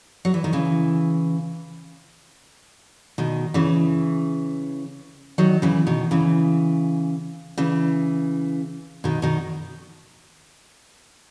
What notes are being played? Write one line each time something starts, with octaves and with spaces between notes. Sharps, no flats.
F#3
E3
D#3
C#3 E3
B2 D#3
C#3 E3
D#3 F#3
C#3 E3
B2 D#3
C#3 E3
C#3 E3
B2 D#3
B2 D#3